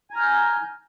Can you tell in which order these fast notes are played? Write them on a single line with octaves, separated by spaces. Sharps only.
G#5 A#5 F6 G6